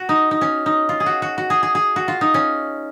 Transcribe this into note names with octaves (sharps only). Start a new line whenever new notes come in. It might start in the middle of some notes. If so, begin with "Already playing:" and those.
Already playing: F#4
D#4
D#4
C#4
D#4
F4
G#4
F#4
F#4
F#4
G#4
G#4
G#4
F#4
F4
D#4
C#4